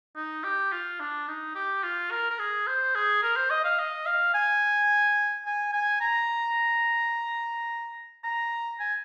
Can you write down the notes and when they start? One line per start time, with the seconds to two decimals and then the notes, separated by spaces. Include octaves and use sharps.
0.16 D#4
0.44 G4
0.72 F4
1.00 D4
1.28 D#4
1.55 G4
1.83 F4
2.11 A#4
2.30 A#4
2.39 G#4
2.67 C5
2.95 G#4
3.23 A#4
3.36 C5
3.50 D#5
3.64 F5
3.79 D#5
4.06 F5
4.34 G#5
5.45 G#5
5.73 G#5
6.01 A#5
8.24 A#5
8.80 G#5